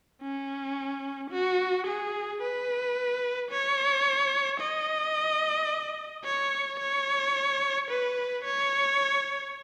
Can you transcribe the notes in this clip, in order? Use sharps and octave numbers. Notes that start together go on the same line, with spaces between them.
C#4
F#4
G#4
B4
C#5
D#5
C#5
C#5
B4
C#5